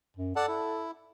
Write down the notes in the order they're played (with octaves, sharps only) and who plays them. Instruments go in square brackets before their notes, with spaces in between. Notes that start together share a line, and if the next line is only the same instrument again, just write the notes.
[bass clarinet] F#2
[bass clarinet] A4 [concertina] D5 F#5 A5
[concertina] E4